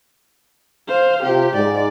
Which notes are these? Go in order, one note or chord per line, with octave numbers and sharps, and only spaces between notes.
C5 F5
C3 F4 G4
G#2 D5